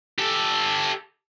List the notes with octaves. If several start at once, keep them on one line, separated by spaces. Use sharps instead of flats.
G4 A4